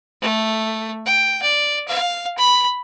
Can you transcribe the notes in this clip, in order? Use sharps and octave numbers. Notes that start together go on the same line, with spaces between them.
A3
G5
D5
F5
B5